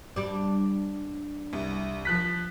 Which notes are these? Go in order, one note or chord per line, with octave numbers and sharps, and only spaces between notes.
G3 D4
C2
F3 F#6 B6